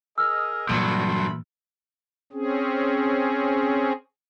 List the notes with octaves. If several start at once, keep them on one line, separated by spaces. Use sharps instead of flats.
G#4 A#4 D#5 E6 F6
G2 A#2 E3 F#3 A3 B5 C6
C4 C#4 G#4